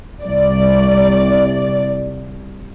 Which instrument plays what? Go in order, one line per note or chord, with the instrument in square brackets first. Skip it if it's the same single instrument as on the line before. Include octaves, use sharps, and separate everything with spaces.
[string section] C2 D5